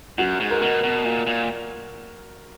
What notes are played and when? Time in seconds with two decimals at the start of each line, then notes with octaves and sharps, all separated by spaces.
0.18 F#2 F#4
0.40 G#2
0.51 A#4
0.62 B2
0.83 B2
1.05 A#2
1.27 A#2